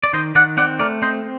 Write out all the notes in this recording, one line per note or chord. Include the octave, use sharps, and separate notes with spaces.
D5
D#3 C5 D#5
D#3 D5 F#5
C4 D5 F#5
A3 A#4 D5
C4 C5 D#5